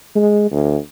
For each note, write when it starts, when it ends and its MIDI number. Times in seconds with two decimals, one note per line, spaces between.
0.15 0.48 56
0.51 0.77 38